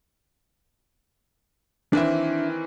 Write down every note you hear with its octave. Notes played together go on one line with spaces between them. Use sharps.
D#3 E3 C4 D4 E5